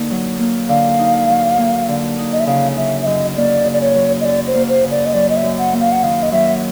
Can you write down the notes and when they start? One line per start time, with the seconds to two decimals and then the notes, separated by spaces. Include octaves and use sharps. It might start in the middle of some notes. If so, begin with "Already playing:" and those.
Already playing: D3 A#3 D#4
0.11 F#3
0.39 A#3
0.69 D3 F5
0.99 D#4
1.29 F#3
1.58 A#3
1.88 D3
2.18 D#4
2.33 D#5
2.40 E5
2.47 C#3 F5
2.76 F#3 E5
3.02 E5
3.06 F#2 D#5
3.37 A#3 D5
3.65 C#3
3.73 D5
3.81 C#5
3.95 F#3
4.21 D#5
4.25 F#2 D5
4.47 C5
4.55 A#3
4.69 C5
4.84 C#3
4.91 D5
5.06 D#5
5.14 F#3 D5
5.30 D#5
5.37 E5
5.44 F#2
5.58 F#5
5.73 A#3
5.81 F5
5.92 F#5
6.03 D#3 F5
6.23 D#5
6.32 F#3 E5